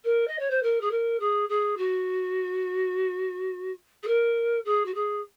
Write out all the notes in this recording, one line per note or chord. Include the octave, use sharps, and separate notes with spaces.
A#4
D#5
C#5
C5
A#4
G#4
A#4
G#4
G#4
F#4
G#4
A#4
G#4
F#4
G#4